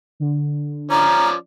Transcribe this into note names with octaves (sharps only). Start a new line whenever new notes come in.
D3
F3 C#4 D5 A#5